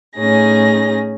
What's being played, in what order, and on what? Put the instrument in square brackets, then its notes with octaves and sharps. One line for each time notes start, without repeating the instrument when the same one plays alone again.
[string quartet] A2 C#4 D#4 G#4 A#6